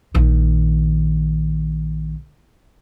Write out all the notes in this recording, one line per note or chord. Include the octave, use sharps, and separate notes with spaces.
A#1 D#3